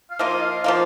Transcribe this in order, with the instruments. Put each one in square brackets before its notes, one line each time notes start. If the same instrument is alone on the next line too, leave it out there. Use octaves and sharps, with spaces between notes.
[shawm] F5
[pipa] F3 A#3 F4 [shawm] D#5
[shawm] F5
[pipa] F3 A#3 F4 [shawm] F5